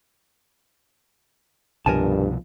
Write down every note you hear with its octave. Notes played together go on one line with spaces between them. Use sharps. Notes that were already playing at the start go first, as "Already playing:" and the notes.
C2 G2 B2 F3 A#4 G#5 A5